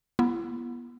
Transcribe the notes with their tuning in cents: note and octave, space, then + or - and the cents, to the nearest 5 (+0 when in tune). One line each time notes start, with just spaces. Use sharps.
B3 -30 E4 +40